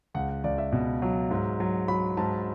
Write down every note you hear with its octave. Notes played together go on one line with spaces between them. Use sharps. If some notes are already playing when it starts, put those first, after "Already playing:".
C#2 F#5
F#5
C#2 D5
E5
B2
F#3
G#2
F#3
F#3 B5
G#2 A5